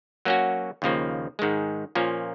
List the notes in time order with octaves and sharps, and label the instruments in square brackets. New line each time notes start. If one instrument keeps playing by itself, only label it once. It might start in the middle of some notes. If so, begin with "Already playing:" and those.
[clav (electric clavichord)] F#3 A#3 C#4 F#4
D#2 C#3 F3 A#3
G#2 D#3 G#3
A#2 F3 A#3 C#4